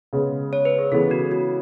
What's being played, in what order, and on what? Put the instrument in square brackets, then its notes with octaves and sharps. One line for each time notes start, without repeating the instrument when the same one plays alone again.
[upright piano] C#3 G#3 B3
[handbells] C#5
B4
G#4
[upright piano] C#3 E3 G#3 B3 [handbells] A4
[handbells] F#4
F#4